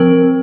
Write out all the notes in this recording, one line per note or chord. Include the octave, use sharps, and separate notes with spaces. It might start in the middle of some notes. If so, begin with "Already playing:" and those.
Already playing: F3 C4 A#4